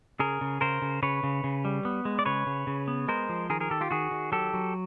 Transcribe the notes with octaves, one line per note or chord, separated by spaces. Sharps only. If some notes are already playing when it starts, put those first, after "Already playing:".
C#3 G#4 A#4
C#3
C#3 A#4 C5
C#3
C#3 B4 C#5
C#3
C#3
G3
B3
G#3
D5
C#3 B4 C#5
C#3
C#3
B3
G#3 A#4 C5
F3
D#3 G#4 A#4
G#4 A#4
D#3 G4 A4
F4 G4
D#3 F#4 G#4
D#3
F#3 G4 A4
F#3